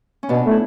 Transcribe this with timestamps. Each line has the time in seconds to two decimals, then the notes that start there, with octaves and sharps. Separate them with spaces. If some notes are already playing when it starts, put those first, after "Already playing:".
0.23 C#4
0.29 B2 B3 D4
0.45 A3 E4